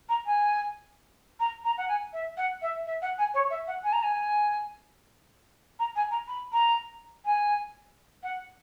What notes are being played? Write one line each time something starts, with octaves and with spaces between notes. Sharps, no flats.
A#5
G#5
A#5
A#5
F#5
G#5
E5
F#5
E5
E5
F#5
G#5
C#5
E5
F#5
G#5
A#5
G#5
A#5
G#5
A#5
B5
A#5
G#5
F#5